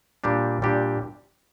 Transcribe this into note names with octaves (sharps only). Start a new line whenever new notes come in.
A#2 G3 D4 G4
A#2 G3 D4 G4